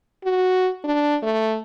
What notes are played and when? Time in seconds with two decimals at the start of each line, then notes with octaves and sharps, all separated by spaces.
0.24 F#4
0.84 D4
1.23 A3